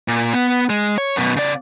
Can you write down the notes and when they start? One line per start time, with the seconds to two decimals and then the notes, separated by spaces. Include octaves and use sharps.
0.08 A#2
0.34 B3
0.70 G#3
0.98 C#5
1.16 F#2 B2
1.36 C#3 D5